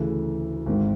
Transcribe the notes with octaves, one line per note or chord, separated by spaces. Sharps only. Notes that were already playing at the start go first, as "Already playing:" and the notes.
Already playing: D2 C#3 E3 A4
G#1 G#2 D#3